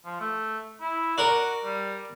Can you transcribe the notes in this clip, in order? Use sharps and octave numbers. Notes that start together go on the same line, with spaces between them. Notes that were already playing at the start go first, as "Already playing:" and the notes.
F3
A3
E4
F#4 A#4 D5
G3